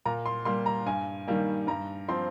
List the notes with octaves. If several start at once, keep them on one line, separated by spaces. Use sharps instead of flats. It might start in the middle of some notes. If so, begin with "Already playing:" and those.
A#2 A#5
C6
G3 A#3 C6
A#5
G2 G#5
D#3 G3 A#3
G2 A#5
F3 C4 C6